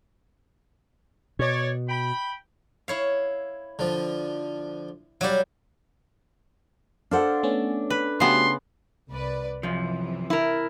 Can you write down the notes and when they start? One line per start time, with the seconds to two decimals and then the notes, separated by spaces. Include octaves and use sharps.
1.39 B2 C#5 D5
1.89 G5 B5
2.88 E4 C#5 F5
3.79 D3 F3
5.21 F#3 G3 D5 F5
7.11 D4 A4 C5 F5 F#5
7.43 A3 B3 C#4
7.90 B4
8.20 C#3 A3 B3 F#4 G4 C6
9.10 C2 B4 D5
9.63 F#2 C3 E3 F3
10.30 E4 A#4